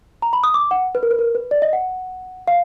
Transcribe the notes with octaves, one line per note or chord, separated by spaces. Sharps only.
A#5
B5
D#6
D6
F#5
B4
A#4
B4
A#4
B4
D5
D#5
F#5
F5